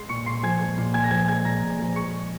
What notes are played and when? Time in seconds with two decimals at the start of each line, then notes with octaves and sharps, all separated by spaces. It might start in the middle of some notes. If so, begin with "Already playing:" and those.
Already playing: G#3 C6 C7
0.09 A#2 C#6 C#7
0.26 A#2 C6 C7
0.43 F3 G#5 G#6
0.60 G#3
0.78 A#2
0.94 A#2 G#5 G#6
1.04 A#6
1.11 F3 G#5 G#6
1.28 G#3 G#5 G#6
1.45 A#2 A#5 A#6
1.62 A#2
1.79 F3
1.96 G#3 C#6 C#7